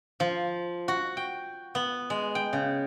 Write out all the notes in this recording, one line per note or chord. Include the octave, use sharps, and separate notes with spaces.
F3
F#4
G5
B3
G#3
G5
C#3